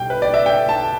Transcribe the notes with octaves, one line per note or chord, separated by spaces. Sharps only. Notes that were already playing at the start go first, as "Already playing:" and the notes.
Already playing: B2 G3 G5
B4
D5
E5
G5
A5